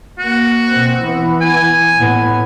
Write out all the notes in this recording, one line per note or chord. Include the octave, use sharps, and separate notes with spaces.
A#3 F#4
B2 C4
E3 B3
G#5
A2 B3